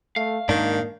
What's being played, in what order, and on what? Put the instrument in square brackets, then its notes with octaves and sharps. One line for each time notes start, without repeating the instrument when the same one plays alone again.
[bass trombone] A3 [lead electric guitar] F5
[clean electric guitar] G#2 D4 [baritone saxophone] D#3 [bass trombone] A#3